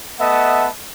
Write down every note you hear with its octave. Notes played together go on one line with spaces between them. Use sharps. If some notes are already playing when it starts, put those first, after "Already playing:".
A3 B3 D#5 E5 F#5 A5